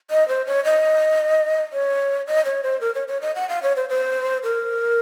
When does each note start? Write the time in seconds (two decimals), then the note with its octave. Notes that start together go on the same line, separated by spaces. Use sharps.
0.11 D#5
0.28 C5
0.47 C#5
0.65 D#5
1.73 C#5
2.27 D#5
2.45 C#5
2.63 C5
2.81 A#4
2.95 C#5
3.08 C#5
3.22 D#5
3.35 F#5
3.49 F5
3.63 C#5
3.76 C5
3.89 C5
4.43 A#4